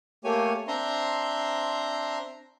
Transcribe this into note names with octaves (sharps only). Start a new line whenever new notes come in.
A3 A#3 G4 C#5 G#5
C4 D4 E5 A#5 C6